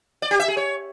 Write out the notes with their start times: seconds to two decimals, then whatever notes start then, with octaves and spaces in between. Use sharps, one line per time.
0.22 D5
0.31 G4
0.40 E5
0.48 G#4
0.57 C#5